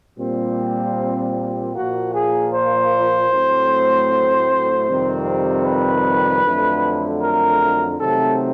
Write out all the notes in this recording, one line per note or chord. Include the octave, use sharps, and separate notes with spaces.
A#2 G3 C4
A#2 F3 A#3 F#4
G#4
C5
A2 F#3 A3 C4
F2 C3 D#3 G3 C4
B4
F2 D3 F#3 A3
A#4
C3 D#3 F#3 A3 C4 A4